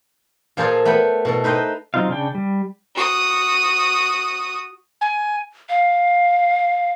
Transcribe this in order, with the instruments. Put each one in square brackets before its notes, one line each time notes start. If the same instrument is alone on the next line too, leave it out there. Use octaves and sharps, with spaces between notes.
[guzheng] A#2 F3 G#4 A4 C5 D5
A3 B3 G5 B5
B2 E4 A4
D#4 B4 C5 D#5 G5
[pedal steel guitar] F#3 C4 D#4 F4 F5
C#3 D4 G5
G3
[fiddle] F#4 D#6
[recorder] G#5
[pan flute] F5